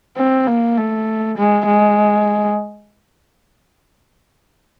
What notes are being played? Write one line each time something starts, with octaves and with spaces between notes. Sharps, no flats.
C4
A#3
A3
G#3
G#3